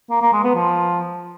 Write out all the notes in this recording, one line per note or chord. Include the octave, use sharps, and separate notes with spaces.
A#3
A#3
G#3
B3
F3